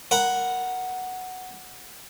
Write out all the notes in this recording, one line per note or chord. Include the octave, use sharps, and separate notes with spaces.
A#4 F#5 B5